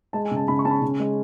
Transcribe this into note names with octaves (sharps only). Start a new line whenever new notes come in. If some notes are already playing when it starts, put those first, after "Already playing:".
G#3 A5
G#5
C#3
A5
C#3 B5
C#6
C#4 A5
B5
C#3
G#3